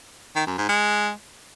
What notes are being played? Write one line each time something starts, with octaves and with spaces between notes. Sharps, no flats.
D#3
F#2
G#2
G#3